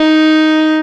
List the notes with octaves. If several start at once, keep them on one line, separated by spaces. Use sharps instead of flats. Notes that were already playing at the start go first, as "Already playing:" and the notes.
Already playing: D#4